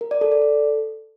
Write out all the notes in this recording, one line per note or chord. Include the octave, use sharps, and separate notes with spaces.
A#4
D5
A4
D5
A4